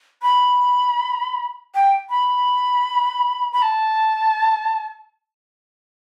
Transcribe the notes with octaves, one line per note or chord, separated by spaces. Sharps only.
B5
G5
B5
B5
A5